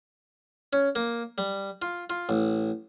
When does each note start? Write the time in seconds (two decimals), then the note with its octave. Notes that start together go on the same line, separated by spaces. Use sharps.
0.73 C#4
0.95 A#3
1.38 G3
1.82 F4
2.10 F4
2.29 A1